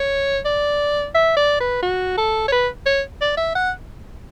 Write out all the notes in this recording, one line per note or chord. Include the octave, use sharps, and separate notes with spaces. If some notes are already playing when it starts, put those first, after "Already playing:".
Already playing: C#5
D5
E5
D5
B4
F#4
A4
C#5
B4
C#5
D5
E5
F#5